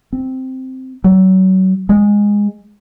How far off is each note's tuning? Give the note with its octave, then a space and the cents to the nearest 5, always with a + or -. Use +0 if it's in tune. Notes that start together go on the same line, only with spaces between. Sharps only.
C4 -5
F#3 +30
G#3 -15